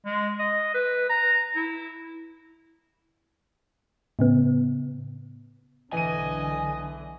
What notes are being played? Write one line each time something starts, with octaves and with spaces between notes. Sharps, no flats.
G#3
D#5
B4
A#5
E4
A2 C#3 B3
B1 D3 E3 D#5 G#5 D#7